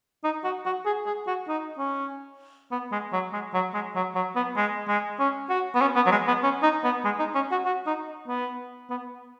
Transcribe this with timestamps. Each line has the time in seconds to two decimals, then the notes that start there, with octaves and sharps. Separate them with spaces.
0.24 D#4
0.44 F#4
0.66 F#4
0.86 G#4
1.06 G#4
1.27 F#4
1.48 D#4
1.78 C#4
2.71 B3
2.92 G#3
3.13 F#3
3.33 G#3
3.54 F#3
3.74 G#3
3.96 F#3
4.15 F#3
4.36 B3
4.56 G#3
4.88 G#3
5.19 C#4
5.50 F#4
5.75 B3
5.81 C#4
5.96 B3
6.06 F#3
6.11 G#3
6.28 B3
6.43 C#4
6.63 D#4
6.84 B3
7.05 G#3
7.19 D#4
7.35 C#4
7.51 F#4
7.66 F#4
7.87 D#4
8.28 B3
8.90 B3